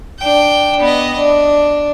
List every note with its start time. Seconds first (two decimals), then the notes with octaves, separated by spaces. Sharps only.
0.19 D4 G5
0.80 B3 D#5
1.17 D4